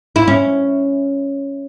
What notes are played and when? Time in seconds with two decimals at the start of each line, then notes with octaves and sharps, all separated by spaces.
0.16 E4
0.28 C#4